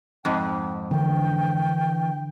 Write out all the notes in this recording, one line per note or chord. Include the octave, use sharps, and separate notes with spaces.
F2 G#2 G5
D3 E3 G5